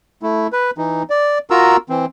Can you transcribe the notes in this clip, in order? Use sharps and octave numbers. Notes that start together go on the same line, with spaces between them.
A3 E4
B4
E3 D#4
D5
F4 F#4 A#4 A#5 E6
E3 C4